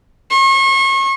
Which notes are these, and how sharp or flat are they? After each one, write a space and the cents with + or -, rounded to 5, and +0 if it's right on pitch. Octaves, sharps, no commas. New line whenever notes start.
C#6 -40